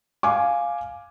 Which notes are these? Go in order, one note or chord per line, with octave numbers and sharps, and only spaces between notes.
F5 G#5 D6